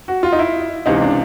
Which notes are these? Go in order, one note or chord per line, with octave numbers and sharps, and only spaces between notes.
F#4
F4
D#4
E4
C#2 C3 E3 D#4
D4